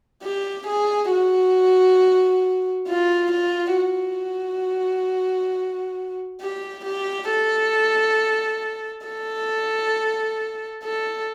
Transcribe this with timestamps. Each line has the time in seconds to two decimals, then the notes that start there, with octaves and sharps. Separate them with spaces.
0.23 G4
0.67 G#4
1.11 F#4
2.88 F4
3.32 F4
3.76 F#4
6.41 G4
6.85 G4
7.30 A4
9.06 A4
10.84 A4